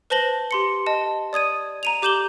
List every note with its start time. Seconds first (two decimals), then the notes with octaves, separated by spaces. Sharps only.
0.10 B4 C5 A5 A#6 F#7 G7
0.51 G4 C6 C#7
0.86 D#5 A5
1.33 D5 D#6 G#6 D#7
1.83 A#5 D#7 F7
2.02 G4 D6 G6 E7 F#7 G7